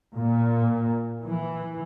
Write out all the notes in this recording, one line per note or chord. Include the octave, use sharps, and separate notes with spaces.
A#2
E3